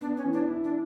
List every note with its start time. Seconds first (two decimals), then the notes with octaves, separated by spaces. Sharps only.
0.01 B3 D4
0.17 C#4
0.25 E3
0.33 D4
0.48 E4
0.64 D4